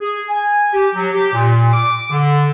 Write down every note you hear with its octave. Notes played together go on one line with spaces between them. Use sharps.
G#4
G#5
G4
F#3
G4
A#2
D6
D3